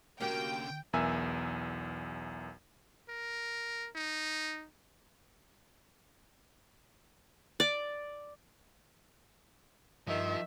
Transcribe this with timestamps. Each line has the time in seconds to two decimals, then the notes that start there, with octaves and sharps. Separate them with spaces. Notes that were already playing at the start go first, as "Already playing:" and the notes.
0.21 D3 A#3 C#4 F#4 G4 G5
0.93 B1 E2 A#4 E5 G#5 E6
3.09 A#4
3.96 D#4
7.60 D5
10.07 G2 D#3 F3 E5